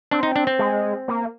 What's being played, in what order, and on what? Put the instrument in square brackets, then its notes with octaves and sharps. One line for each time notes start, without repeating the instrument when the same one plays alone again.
[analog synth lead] C4 [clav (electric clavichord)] D4
[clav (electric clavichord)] D#4
D4
C4
[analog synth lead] G#3
A#3